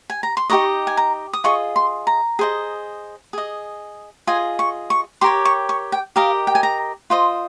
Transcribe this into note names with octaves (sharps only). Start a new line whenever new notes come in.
G#5
A#5
C6
D#4 G4 A#4 D#5 C#6
G#5
A#5
D#6
F4 G#4 D#5 C#6
C6
A#5
G#4 C5 D#5
G#4 D#5
F4 G#4 D#5 G#5
C#6
C#6
G4 A#4 C#5 C6
C#6
C#6
G5
G4 A#4 D#5 F5
G5
G#5
A#5
F4 C5 D#5 C6